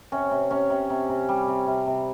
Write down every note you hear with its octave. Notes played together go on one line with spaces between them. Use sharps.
C3 C#4
C3
C3 C#4
C3
C3
C3
G3
C3
C3
C3